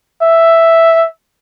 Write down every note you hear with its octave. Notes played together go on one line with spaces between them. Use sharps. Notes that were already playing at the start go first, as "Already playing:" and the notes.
E5